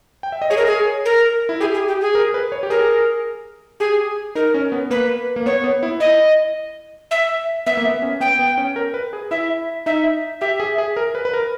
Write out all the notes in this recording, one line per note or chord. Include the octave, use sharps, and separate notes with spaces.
G5
E5
D#5
G#4 C#5
A#4
G#4
A#4
E4
G4 G#4
G#4
G4
G#4
A#4
B4
C#5
G4
G#4 A#4
G4 G#4
D#4 A#4
C#4
B3
A#3 B4
A#3
B3 C#5
B3
E4
E4 D#5
E5
B3 E5
A#3
B3
C#4
B3 G5
B3
C#4
A#4
B4
G#4
E4 E5
D#4 E5
G4 E5
G#4
G#4
A#4
B4
B4
A#4